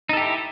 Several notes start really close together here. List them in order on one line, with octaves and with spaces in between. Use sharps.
D#4 A4 G4 E4